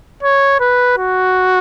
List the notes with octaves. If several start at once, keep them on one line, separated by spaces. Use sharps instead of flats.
C#5
B4
F#4